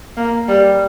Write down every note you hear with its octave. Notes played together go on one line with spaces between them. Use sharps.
A#3
G3